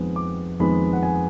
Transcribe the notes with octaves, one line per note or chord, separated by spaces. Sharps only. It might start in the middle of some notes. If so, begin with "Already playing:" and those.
Already playing: F2 D#3 G#3 B3
D6
F2 D#3 G#3 B3 B5
F#5
G#5